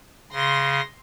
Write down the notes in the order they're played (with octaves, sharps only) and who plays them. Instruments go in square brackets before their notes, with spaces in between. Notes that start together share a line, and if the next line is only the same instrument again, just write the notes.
[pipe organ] C#3 [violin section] C6 A#6